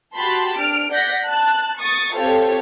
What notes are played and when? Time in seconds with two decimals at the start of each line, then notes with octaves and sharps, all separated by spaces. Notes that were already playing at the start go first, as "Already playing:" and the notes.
0.16 F#4 G4 A5 B5 C6
0.59 D4 F6 D7
0.91 D5 F#5 G6 A#6 B6
1.25 A5 F#6
1.80 C#6 D#6 A6
2.17 C4 F4 G4 A4 C5 C#5